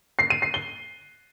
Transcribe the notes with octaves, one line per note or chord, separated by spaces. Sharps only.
C7
D#7
C7
G7